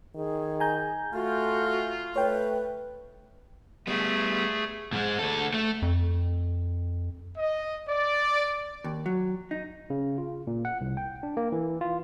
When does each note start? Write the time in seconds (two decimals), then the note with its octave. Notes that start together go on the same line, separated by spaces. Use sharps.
0.15 D#3 G#4
0.60 G#5 A#5 G6
1.14 A3 F4 F#4
2.16 A3 B4 C#5 G5
3.87 G3 A3 B3 G#4
4.93 G#2 G#3
5.19 D2 A4
5.54 A3
5.82 F2
7.38 D#5
7.88 D5
8.84 D#2
9.06 F#3
9.51 D#4
9.90 C#3
10.18 F4
10.47 A#2
10.65 F#5
10.81 C2
10.97 G5
11.23 D4
11.37 A#3
11.52 E3
11.81 F4